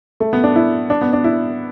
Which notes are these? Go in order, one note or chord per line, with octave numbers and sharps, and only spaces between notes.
A3
B3
D4
E4
D4
B3
D4
E4